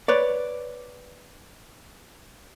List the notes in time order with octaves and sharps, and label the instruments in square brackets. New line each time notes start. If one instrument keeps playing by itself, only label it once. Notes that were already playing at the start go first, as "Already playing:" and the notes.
[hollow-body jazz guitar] B4 C#5 D5